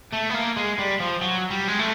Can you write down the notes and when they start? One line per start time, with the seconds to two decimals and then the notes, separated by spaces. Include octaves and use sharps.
0.13 A3
0.30 B3
0.35 A#3
0.57 G#3
0.79 G3
1.00 F3
1.21 F#3
1.51 G3
1.68 G#3
1.79 A3